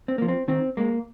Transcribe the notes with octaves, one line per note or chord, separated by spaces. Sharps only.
C4
F3 A#3
C4
D#3 C4
G#3 A#3